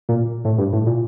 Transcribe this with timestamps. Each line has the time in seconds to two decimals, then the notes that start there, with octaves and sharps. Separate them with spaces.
0.09 A#2
0.45 A2
0.58 G2
0.73 A2
0.86 A#2